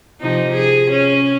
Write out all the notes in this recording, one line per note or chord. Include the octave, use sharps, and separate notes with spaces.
C3 F3 D#4
G#4
C#4